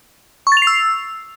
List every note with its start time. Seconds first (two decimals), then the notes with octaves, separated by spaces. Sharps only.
0.47 C#6
0.52 A6
0.57 F7
0.62 C7
0.67 E6